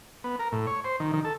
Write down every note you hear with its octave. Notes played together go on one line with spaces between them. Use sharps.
B3
A#4
A2
C#5
C5
D#3
D#3
A4